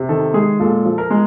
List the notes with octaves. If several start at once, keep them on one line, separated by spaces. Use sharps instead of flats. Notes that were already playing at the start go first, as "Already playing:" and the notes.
Already playing: C3
D#3 A4
G#3 G#4
A#2 A4
F3
A#4
G#3